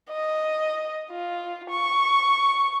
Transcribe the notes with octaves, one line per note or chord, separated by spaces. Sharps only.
D#5
F4
C#6